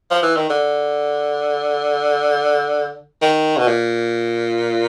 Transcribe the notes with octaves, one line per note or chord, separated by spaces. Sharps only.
F3
E3
D#3
D3
D#3
B2
A#2